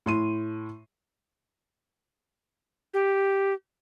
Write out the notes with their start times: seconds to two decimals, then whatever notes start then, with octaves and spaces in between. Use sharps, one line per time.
0.06 A2 C6 D#7
2.94 G4